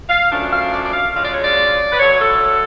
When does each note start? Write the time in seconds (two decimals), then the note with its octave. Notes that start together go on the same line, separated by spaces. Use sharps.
0.09 F5
0.31 F#2 F3 A3 D4
0.52 F5
0.72 D5
0.85 D5
0.93 F5
1.14 D2 C#3 G#3 D4 F4 F5
1.24 D5
1.33 C#5
1.43 D5
1.91 B4
1.99 D3 F#3 A3 C#5
2.20 A4